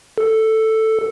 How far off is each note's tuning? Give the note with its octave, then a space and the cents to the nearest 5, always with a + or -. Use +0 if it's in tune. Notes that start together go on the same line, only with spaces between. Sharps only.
A4 +5